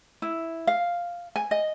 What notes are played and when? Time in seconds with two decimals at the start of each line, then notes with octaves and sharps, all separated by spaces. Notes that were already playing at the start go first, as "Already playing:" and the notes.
0.22 E4
0.67 F5
1.36 G#5
1.51 D#5